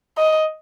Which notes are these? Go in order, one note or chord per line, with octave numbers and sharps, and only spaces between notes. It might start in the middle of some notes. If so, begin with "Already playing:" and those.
D#5